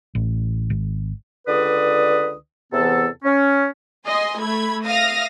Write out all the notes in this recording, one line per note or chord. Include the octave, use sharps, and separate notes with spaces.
A1
G#1
C#2 D3 B4 D5 D#6
E2 C3 E3 B3 A4
C#4
D#5 G#5 C6
A3 B5 G#6
E5 F5 D#6 F6 A#6